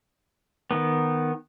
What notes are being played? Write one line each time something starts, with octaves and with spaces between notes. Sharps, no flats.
D#3 B3